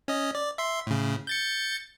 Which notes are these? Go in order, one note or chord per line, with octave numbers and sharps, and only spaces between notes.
C#4 D#5
D5
E5 C6
A2 C#3
G6 A6 C#7